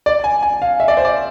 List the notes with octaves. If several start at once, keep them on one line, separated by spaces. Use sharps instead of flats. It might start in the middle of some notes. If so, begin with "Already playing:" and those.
D5
G#5
G#5
F5
E5
D5
C5
D5